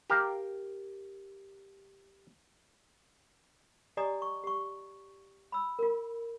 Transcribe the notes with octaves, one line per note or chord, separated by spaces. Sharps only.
G4 A#4 F5
G4 D5 D#5 G#5 A#5 D#6
C#6
G4 C#6
B5 E6
F4 A#4